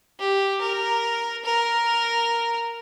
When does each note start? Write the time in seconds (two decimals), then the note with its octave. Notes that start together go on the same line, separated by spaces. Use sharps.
0.19 G4
0.61 A#4
1.44 A#4